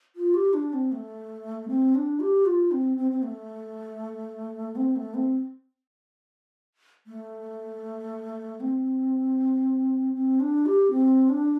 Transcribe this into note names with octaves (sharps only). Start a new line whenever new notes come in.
F4
G4
D4
C4
A3
C4
D4
G4
F4
C4
C4
C4
A3
C4
A3
C4
A3
C4
C4
D4
G4
C4
D4